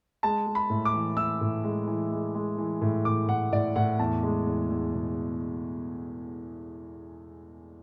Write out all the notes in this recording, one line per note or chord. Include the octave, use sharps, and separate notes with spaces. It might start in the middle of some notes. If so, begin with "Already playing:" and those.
G#3 A5
G#3
B5
A2
D6
E3
E3 E6
A2
G#3
E3
G#3
G#3
E3
A2
A2 D6
A2 F#5
A2 D5
A2 F#5
E2 A5
G#3
E2
E2
B2